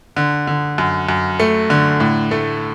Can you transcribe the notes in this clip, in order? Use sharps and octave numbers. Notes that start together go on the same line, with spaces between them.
D3
D3
F#2
F#2
A3
D3
A2
A3